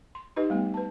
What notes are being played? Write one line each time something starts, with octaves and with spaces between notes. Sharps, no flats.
C6
D#4 G4 B4 D#5
G3 A3 B3
B4 A5